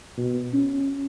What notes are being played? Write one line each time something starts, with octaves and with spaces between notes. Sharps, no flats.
B2
C#4